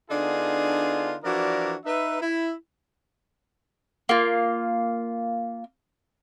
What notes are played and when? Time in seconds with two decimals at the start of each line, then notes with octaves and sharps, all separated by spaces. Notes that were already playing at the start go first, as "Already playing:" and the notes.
0.11 D3 B3 D4 D#4 F4 G#4
1.24 E3 F3 D4 F#4 A#4 D5
1.86 D#4 B4 E5
2.21 E4
4.09 A#3 F4